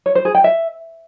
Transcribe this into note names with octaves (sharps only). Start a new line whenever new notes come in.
C#5
C5
G#4
G5
E5